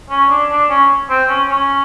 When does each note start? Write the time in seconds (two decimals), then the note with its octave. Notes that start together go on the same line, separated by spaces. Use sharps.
0.10 C#4
0.30 D4
0.50 D4
0.70 C#4
1.10 C4
1.29 C#4
1.49 C#4